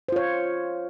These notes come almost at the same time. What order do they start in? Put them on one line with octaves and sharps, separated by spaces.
C5 F4 C#5